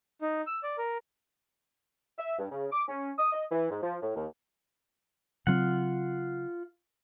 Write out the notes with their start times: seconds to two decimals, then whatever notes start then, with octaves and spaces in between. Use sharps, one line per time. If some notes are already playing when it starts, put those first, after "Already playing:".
0.22 D#4
0.47 E6
0.63 D5
0.78 A#4
2.18 E5
2.39 G2
2.51 C#3
2.72 D6
2.89 C#4
3.18 D#6
3.33 D#5
3.51 E3
3.71 G#2
3.83 F3
4.02 A2
4.16 D#2
5.47 C#3 F#3 C4 F4 F#5